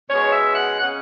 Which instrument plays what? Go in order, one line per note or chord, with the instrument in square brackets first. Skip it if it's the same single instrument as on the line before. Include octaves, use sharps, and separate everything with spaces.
[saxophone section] B2 G#3 C#4 C#5
E5
F#5
C#3 G#3 C#4 F#5